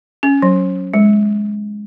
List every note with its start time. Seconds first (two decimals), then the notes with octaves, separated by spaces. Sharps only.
0.23 C#4
0.42 F#3
0.94 G#3